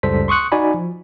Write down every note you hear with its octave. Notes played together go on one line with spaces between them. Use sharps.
C#2 F#2 G3 A4 C5 B6
C6 C#6 D#6 F#6 C#7
D#4 F#4 D5 G#5 B5
F3